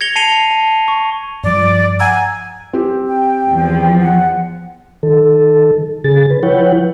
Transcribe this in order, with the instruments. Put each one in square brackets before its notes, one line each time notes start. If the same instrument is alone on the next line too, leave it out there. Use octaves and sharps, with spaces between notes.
[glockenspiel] G#6 A#6 C#7 F7 G7
A5 C7 C#7 D#7 F7 G7
A5
C#6
[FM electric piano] G2 F3 [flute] D5
[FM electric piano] F#5 A#5 E6 [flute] G#5
[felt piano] C4 G4
[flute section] G5
[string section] E2 F3
[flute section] F#5
[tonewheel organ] D#3 A4
C#3 G#4 A6
B4
F3 E4 B4 C#5 F#5 G5